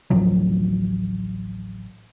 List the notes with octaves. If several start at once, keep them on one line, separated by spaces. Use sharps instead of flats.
A1 D2 F3 F#3